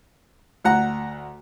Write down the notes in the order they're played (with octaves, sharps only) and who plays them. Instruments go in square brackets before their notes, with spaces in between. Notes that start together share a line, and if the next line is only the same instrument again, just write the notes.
[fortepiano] D2 F#5 A#5